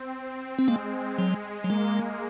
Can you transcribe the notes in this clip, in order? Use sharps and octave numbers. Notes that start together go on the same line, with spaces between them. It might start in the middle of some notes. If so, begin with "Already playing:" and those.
Already playing: C4
C4
G#3 A#3
F#3
F#3
G#3 A#3